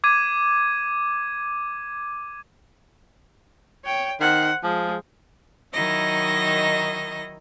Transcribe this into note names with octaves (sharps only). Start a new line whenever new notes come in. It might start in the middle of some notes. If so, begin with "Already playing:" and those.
D6 G#6 D#7
C#5 G5
D#3 C5 F#5
F3 G#3
D#3 F#3 D#4 E4 D#5 A#6